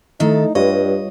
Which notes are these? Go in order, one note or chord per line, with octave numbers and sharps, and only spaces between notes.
D#3 A3 D#4 E4 A4 E5
G2 G3 F4 B4 C#5 D#5